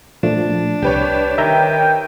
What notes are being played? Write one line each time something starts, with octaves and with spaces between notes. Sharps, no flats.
A#2 F3 A3 D4
C2 G4 B4 C#5
D#3 E5 G5 A#5 G6